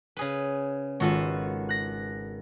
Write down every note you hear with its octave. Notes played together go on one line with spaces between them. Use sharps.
C#3 G#4 B4
G#1 F4 F#4 A4 B4
F#6 A#6